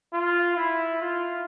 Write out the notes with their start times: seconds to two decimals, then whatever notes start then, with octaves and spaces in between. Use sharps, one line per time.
0.12 F4
0.56 E4
1.00 F4